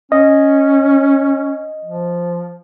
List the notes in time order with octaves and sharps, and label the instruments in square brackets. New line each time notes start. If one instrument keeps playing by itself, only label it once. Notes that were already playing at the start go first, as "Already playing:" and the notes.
[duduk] C#4 [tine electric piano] D#5
[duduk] F3